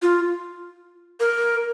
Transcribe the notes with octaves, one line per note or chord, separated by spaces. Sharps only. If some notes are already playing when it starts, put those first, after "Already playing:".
F4
A#4